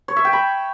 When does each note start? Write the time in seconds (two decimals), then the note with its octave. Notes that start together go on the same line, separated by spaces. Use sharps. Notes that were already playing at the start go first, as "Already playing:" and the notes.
0.08 C#5
0.17 E5
0.25 G5
0.33 B5